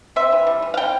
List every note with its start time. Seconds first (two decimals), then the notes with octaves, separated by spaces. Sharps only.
0.16 C4 E5
0.32 E3
0.47 G3
0.62 E3
0.74 F5
0.77 C4 G5